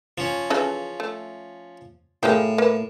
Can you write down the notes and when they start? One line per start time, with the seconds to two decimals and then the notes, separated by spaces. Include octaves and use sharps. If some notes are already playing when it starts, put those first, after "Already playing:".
0.18 F3 C#4
0.50 C#3 E3 A4
1.00 A3
2.23 A2 G#3 A#3 G4
2.58 A#3 B4